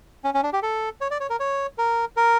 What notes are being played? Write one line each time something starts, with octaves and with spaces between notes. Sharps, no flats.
C#4
C#4
D4
G4
A4
C#5
D5
C#5
A#4
C#5
A#4
A#4